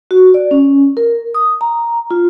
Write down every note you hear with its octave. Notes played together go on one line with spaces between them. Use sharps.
F#4
D5
C#4
A#4
D#6
A#5
F4